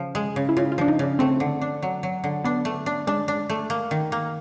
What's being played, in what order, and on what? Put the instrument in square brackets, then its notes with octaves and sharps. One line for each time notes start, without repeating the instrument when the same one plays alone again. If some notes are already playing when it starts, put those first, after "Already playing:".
Already playing: [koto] C#3 F3
G#3
C#3
[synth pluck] E4
[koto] C#3 [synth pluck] F4
[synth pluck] F4
[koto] F3 [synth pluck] D4
[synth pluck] D#4
[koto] C#3 [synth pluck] D4
[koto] A3 [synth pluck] C4
[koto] D3
D4
F#3
F#3
D3
[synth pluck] B3 [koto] D4
[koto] A3
D4
[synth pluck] G#3 [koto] D4
[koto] D4
A3
A#3
D#3
A#3